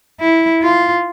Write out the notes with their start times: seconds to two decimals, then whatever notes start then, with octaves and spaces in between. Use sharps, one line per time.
0.20 E4
0.63 F4